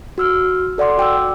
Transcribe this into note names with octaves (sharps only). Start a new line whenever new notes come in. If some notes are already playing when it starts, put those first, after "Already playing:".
F#4 E6 F6
A4 D5 F#5 C6 D6
F#4 G5 D6 E6